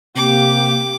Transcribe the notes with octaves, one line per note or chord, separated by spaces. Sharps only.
C3 A#3 G4 D6